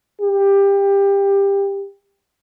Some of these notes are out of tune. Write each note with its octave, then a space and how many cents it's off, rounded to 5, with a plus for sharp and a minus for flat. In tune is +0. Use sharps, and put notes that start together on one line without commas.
G4 +20